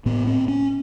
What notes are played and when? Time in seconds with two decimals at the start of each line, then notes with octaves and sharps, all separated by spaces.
0.06 A2 B3
0.27 C4
0.48 C#4